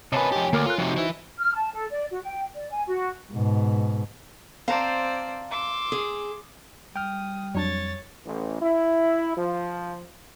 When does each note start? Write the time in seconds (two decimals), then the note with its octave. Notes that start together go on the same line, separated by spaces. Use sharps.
0.12 C3 B4 C#5 D#5 F#5 G#5 A5
0.32 F2 G4
0.53 D2 A#3 A#4 D6
0.66 F4 A4 A#4 F#6
0.78 F2 C3 D#4 F#4 C5
0.97 E3 E4
1.38 F6
1.54 A5
1.72 A4
1.90 D5
2.10 F#4
2.22 G5
2.54 D5
2.70 G#5
2.87 F#4
3.32 G#2 B2
4.68 C4 C5 D5 F5 A5 A#5
5.49 C6 D6 E6
5.92 G#4
6.96 G3 G5 D#6 F6
7.55 F2 F#3 D4 C#5 A6
8.24 A1
8.60 E4
9.36 F3